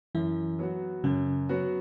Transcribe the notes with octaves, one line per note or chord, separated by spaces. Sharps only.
F#2 E3 E4
F#3 B3 F#4
F#2 C#3 C#4
F#3 B3 F#4